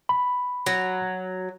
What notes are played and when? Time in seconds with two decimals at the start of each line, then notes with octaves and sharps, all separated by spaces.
0.09 B5
0.66 F#3